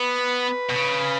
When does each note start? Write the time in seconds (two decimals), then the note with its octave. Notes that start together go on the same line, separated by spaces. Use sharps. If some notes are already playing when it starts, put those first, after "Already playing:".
Already playing: B3 B4
0.69 B2
0.75 C#3